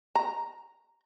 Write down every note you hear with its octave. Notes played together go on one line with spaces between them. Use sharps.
A#5